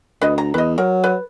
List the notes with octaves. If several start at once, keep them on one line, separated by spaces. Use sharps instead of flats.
D2 B4 D#5
A#5
E2 B4 D#5
F#3 A#4
B4